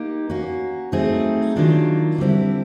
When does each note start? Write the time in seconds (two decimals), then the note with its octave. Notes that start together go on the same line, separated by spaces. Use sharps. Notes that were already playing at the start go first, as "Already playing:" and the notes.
Already playing: A#3 D#4 G4
0.29 A#3 C#4 F#4
0.92 F#3 A3 C4 D#4 G#4
1.56 D#3 F#3 A#3 D4 F4
2.18 D3 G3 C4 E4